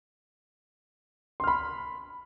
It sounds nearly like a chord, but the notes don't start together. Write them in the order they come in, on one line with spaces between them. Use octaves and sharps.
C6 F6 B5